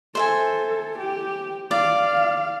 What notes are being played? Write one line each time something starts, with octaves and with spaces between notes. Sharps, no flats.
A4 C5 E5 G#5
G4
D5 F5